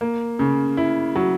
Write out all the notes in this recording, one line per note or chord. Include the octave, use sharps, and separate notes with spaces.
A#3
C#3
E4
F#3